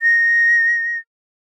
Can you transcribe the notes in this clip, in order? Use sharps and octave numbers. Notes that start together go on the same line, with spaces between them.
A#6